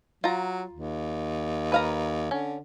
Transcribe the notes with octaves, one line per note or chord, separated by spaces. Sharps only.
F#3 F4 A#5
D#2
B4 F5 A#5
D3 C#4